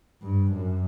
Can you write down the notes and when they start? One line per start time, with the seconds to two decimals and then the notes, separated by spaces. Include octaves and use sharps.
0.22 G2
0.52 F#2